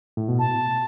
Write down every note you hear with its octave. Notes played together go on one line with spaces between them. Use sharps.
A2
B2
A5